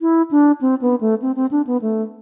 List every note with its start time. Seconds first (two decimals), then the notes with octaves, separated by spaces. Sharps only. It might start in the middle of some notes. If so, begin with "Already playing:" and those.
0.01 E4
0.31 D4
0.61 C4
0.82 B3
1.01 A3
1.22 C4
1.36 C4
1.51 D4
1.67 B3
1.82 A3